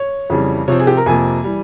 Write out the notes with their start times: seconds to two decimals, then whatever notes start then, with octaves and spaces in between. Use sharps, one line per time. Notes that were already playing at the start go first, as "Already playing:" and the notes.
Already playing: C#5
0.30 F2 C#3 E3 G3
0.68 C3 F3 C4 C#5
0.79 G#4
0.87 G4
0.97 A#4
1.06 F2 C3 F3 A#3 G#5
1.44 E3 G3